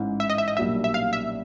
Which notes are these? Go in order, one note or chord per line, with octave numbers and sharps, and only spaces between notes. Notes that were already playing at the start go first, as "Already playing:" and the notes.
Already playing: A1 G#2 E3
E5
D#5
E5
D#5
B1 A#2 G3 A#3 D4 E5
E5
F5
E5